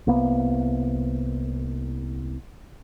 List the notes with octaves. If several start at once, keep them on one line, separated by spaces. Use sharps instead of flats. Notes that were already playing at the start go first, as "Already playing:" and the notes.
C2 A#3 B3